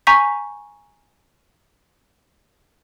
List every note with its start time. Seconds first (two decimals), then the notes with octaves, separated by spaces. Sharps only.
0.07 G#5 A#5 C#6 G6 B6